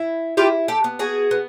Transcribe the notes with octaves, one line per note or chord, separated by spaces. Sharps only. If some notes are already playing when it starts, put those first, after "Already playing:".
Already playing: E4
E4 F4 G4
G4 A4
B3
F#4 G#4
B3